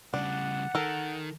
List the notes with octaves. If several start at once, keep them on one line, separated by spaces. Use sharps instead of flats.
C#3 G3 D4 F#5
D#3 A4 A#4